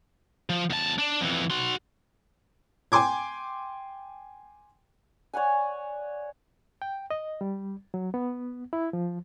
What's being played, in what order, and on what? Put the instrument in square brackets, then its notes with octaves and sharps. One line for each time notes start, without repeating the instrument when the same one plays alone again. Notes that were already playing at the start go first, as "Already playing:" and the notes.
[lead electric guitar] F3
E2 A5
D4
F2 E3
F#4 C6
[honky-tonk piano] G5 G#5 C6 D6 G#6
[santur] C#5 D5 F#5 G#5
[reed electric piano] G5
D#5
G3
F#3
B3
E4
F3